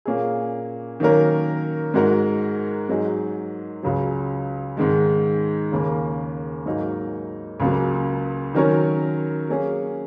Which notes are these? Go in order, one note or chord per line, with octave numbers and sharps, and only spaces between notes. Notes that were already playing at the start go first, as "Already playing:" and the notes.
A#2 A#3 C#4 G#4
D#3 F#3 A#3 C#4 A#4
G#2 G#3 F#4 A#4
G#2 F#3 D#4 G#4
C#2 C#3 F#3
G#2 D#3 G#3
D#2 C#3 A#3
G#2 F#3 A#3 D#4
C#2 C#3 F#3 A#3
D#3 F#3 C#4 A#4 C#5
F#3 A#3 C#4 G#4